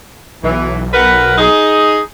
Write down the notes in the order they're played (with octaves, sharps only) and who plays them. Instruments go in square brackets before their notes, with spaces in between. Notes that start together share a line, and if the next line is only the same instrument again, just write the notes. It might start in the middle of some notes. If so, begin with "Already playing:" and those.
[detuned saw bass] B1 [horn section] E3
[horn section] A#4 B4 F#5
D#4 G#4